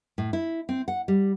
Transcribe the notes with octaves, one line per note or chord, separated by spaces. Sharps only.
A2
E4
C4
F#5
G3